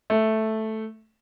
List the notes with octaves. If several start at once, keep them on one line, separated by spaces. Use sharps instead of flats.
A3